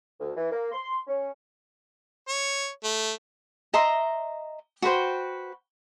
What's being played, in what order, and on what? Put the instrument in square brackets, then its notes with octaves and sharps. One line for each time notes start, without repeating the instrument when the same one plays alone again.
[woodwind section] D2
E3
A#3
C6
C#4
[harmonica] C#5
A3
[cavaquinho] D#5 E5 A#5 C6
F#4 B4 C5 G5